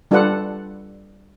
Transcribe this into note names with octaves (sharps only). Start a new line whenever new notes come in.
G3 D4 F4 A4 B4 F#5